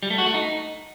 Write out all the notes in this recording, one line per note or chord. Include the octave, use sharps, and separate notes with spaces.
G3
A3
F#4
A3
D#4